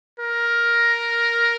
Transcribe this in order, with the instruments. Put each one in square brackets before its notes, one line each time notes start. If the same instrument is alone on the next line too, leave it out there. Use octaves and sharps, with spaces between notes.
[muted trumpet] A#4